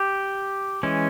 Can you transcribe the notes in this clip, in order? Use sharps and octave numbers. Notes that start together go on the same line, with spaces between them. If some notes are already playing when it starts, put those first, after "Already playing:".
Already playing: G4
E3 G#3 C#4